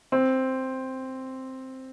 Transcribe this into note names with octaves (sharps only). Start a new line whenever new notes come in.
C4